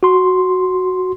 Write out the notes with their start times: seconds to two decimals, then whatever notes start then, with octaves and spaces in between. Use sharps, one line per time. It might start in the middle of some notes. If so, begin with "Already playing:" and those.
0.03 F#4 C6